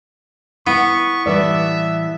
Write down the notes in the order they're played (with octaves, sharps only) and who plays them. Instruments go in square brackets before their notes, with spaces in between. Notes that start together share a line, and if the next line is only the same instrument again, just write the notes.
[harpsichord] B3 [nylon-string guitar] E4 [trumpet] C#6
[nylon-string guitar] A2 E3 [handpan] G3 B4 D5 [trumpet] E5